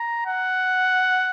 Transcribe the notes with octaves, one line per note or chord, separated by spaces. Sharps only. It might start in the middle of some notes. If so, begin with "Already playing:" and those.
Already playing: A#5
F#5